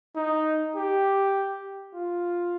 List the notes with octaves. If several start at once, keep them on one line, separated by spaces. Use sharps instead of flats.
D#4
G4
F4